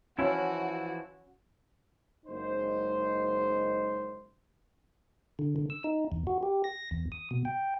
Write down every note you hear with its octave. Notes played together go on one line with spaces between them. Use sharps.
E3 F3 C#4 E4 F#4
F#1 G#3 D#4 C5
D3
D3
E6
D#4
E2
F#4
G4
A#6
E2
D#6
B2
G5